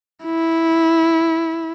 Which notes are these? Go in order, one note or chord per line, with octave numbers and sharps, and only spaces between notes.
E4